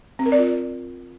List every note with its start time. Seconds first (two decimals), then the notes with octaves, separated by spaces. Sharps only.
0.19 C4
0.26 A#4
0.32 D5
0.39 F4